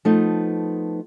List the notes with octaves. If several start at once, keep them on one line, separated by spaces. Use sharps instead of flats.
F3 A3 B3 D#4